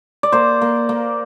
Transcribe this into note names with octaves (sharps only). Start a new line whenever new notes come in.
D5
A#3 C5
A#3
A#3